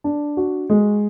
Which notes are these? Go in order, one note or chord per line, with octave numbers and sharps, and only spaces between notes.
D4
F#4
G#3